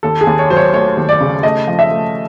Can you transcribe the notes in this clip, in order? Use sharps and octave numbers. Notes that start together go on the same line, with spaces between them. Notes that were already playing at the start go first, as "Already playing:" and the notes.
D#2 A4
G#4
D#2
C#5
F#3 C5
C#5
A3 C#5
D#2
D5
C#3
A3 D#5
F3
E5
A3